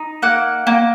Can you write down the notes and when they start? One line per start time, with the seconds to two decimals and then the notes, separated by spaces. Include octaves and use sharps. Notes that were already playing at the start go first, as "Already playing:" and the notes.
Already playing: D#4
0.22 A#3 F#5
0.67 A#3